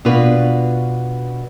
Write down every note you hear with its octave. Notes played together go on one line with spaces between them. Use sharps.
B2 D4 F4 B4